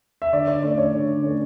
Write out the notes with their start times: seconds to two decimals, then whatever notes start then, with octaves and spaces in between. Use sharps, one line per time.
0.22 E5
0.33 D3 D5
0.48 D5
0.63 A3 C#4 D5
0.78 C#5
0.93 D3
1.23 A3 C#4